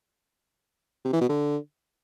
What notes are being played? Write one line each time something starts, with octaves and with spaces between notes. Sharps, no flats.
C3
E3
B2
D3